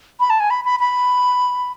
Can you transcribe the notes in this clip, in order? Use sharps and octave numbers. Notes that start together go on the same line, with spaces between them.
B5
A5
G#5
B5
B5
B5